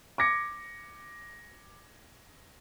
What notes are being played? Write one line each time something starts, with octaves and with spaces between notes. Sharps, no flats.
D6 G#6 A#6 C#7